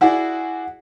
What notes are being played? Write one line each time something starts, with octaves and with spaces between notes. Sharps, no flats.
E4 F#4 G#4 D5